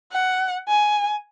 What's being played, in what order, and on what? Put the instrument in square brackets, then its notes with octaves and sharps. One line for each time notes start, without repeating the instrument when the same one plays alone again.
[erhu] F#5
G#5